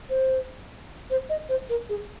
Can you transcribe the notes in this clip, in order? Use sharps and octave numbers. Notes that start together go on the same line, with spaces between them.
C5
C5
D#5
C5
A#4
G#4